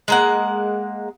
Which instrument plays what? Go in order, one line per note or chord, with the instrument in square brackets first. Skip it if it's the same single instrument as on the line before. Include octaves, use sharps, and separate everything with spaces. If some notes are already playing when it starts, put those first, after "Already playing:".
[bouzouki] G#3 A#3 F#5